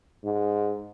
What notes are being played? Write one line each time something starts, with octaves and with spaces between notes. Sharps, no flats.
G#2